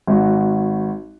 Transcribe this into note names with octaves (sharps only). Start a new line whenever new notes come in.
G#1 F#4